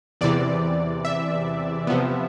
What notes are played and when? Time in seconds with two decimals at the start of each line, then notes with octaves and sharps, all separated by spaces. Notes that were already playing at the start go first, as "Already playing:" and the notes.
0.21 E2 C3 E3 D5
1.05 E5
1.87 C3 F3 B3